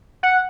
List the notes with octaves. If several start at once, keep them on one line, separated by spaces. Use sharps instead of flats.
F#5